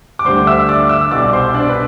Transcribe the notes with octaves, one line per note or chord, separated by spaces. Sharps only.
D6
D2 D3 G3 C5 C6
E5 E6
D5 D6
E5 E6
C2 B2 G3 D5 D6
C5 C6
D4 D5
B4